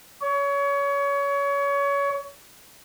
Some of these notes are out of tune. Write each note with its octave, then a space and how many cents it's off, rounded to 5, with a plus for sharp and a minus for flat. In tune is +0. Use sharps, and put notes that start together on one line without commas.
C#5 +25